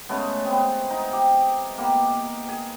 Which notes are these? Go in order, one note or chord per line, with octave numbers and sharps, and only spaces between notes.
C#3 G#3 A3 B3
B3 C4
D#4
G4
A#3 B3 G4
G#4